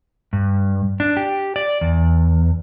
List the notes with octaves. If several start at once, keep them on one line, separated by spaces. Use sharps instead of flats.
G2
D4
G4
D5
E2